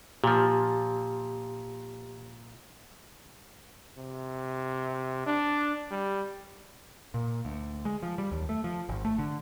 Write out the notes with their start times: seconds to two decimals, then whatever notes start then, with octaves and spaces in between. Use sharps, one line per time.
0.24 A#2 F3 G4
3.98 C3
5.26 D4
5.91 G3
7.14 A#2
7.45 D2
7.85 G#3
8.03 F3
8.18 G3
8.32 D#2
8.49 A3
8.64 F3
8.89 G#1
9.05 A3
9.18 D3